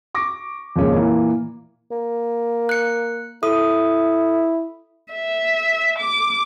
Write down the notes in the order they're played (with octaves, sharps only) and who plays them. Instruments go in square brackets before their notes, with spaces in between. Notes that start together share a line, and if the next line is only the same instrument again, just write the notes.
[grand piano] C#6 D6 A#6
F2 A#2 C#3 G#3 C#4
A#2 E3 A#3
[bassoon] A#3
[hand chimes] F#6 C#7
[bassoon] E4 [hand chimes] A4 D#6
[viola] E5
D6